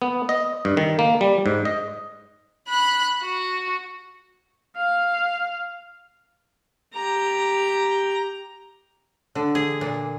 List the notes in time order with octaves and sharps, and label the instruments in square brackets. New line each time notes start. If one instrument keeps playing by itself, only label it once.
[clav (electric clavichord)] B3
D#5
G2
D#3
A#3
G3
G#2
D#5
[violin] B5 F#6
F#4
[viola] F5
[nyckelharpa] G4 A#5
[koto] D3
G#4
A#2